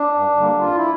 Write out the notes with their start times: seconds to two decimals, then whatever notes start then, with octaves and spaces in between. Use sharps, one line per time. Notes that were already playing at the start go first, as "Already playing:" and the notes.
Already playing: D4
0.14 G2
0.37 D3 G3 A#3
0.60 F2 F4
0.75 E4